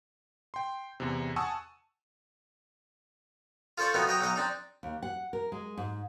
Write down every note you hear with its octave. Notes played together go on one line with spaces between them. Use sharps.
G5 C6
E2 C3
F#5 G#5 A5 C#6 D#6 E6
F4 A4 C5 D5 C#6
B2 F3 A3 B3 C4 D#4
F#3 D#5 G5 A#5
B1 F#3 D#4 D#5 A#5
C4 D4 D#4
D#2
F#5
A#4
G#3
G#2